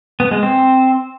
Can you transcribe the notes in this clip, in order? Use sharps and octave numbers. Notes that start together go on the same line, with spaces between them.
B3
G#3
C4